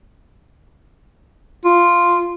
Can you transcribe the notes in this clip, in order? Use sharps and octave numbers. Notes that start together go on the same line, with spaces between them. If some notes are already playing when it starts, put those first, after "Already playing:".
F4